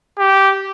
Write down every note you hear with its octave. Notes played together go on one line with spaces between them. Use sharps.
G4